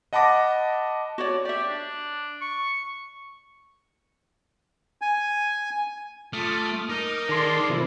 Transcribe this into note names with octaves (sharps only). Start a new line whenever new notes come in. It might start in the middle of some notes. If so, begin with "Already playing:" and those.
D#5 F#5 A5 B5 D6 A#6
F#4 C#5 D5
G4 D5 E5
D4
C#6
G#5
A3 F4 D6 D#6 F6
D#4 A#4
D#3 G#3 A4 D5 C6
C3 D#3 F3 E4